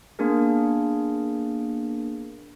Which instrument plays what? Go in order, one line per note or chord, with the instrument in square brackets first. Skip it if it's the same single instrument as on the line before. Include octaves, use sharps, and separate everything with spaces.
[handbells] A#3 B3 D4 G#4 A#4